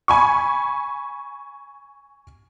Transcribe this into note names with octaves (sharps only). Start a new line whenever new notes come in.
G#5 B5 C#6